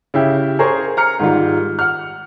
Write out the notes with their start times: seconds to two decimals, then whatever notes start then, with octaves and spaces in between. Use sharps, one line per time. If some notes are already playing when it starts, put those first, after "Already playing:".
0.14 C#3 E4 G4
0.59 G#4 A#4 C5 C#5
0.97 A#5 F6 C#7
1.20 G#2 D#3 G3 F4
1.79 F#5 F6